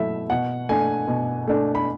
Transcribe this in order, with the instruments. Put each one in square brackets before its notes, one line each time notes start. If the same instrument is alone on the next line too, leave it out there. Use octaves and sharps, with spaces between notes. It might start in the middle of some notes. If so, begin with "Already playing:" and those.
Already playing: [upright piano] B2 F#3 A3 E4 E5
B2 F#5
A3 D4 G#5
B2
A3 D4
B5